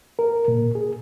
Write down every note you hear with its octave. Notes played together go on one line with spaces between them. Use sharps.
A#4
A#2
G#4